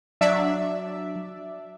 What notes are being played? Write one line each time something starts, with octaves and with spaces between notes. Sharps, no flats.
F#3 D4 D5 E5